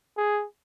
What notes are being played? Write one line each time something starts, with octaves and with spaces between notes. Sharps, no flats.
G#4